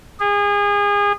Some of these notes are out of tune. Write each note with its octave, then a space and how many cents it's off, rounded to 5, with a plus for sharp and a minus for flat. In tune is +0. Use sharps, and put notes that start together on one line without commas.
G#4 -30